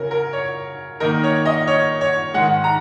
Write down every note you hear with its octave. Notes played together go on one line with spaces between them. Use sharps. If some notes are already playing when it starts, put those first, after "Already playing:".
Already playing: C#3 F#3 C#4 A#4
A#4
C#5
D#3 A#3 D#4 A#4
C#5
D#5
C#5
C#5
G#2 D#3 G#3 F#5
A#5